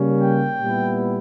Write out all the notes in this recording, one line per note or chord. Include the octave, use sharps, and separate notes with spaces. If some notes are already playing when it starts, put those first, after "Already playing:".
Already playing: C#3 G3 A#3 C#4
G5
A#2 G3 B3 E4